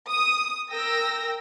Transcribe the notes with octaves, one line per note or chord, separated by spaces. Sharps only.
D#6
A#4 G5 E6 A#6